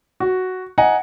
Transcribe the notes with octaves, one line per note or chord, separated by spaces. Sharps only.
F#4
D#5 F#5 G#5 A#5